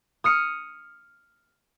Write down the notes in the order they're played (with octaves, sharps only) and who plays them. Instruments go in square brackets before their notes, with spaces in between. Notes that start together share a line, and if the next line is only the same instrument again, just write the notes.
[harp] D#6 F6 C#7